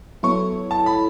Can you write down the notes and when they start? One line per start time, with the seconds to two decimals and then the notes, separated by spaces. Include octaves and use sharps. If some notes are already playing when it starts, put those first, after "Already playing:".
0.23 F#3 B3 E4 A4 C#5 C#6
0.71 A5
0.86 B5